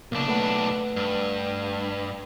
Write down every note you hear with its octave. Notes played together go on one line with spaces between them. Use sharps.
B1 C#3 A#3 D4
A3 B4 F#5
G2